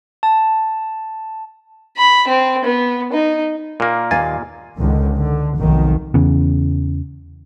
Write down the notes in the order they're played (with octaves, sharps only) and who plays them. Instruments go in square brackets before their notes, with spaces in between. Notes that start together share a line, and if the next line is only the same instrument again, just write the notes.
[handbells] A5
[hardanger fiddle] B5
C4
B3
D#4
[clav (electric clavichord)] A#2 A#3
[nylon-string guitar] D#2 F5 [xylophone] G#5 G#6 A6
[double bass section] C#2 D3 D#3
D3
F1 B1 D#3
[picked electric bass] E2 C#3